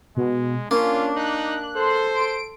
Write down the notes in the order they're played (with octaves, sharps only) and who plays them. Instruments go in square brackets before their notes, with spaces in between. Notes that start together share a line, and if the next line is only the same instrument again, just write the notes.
[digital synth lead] B2 [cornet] G#3
[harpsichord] A#3 [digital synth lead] C#4 [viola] D4 [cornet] F4
[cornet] D#4 [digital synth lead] F#6
[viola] A4 C6 [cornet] C5
[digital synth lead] D7